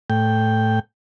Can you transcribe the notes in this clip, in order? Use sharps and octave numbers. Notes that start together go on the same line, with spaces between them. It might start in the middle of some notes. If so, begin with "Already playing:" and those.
A2 G5